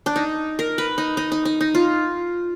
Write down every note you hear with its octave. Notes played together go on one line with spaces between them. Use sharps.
D4
D#4
A#4
B4
D#4
D#4
D#4
D#4
D#4
F4